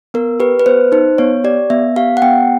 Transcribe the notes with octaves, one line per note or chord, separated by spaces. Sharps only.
B3 A#4
G4 B4
B4
B3 C5
D#4 C5
B3 C#5
G4 D5
B3 E5
G4 F5
F#5
B3 G5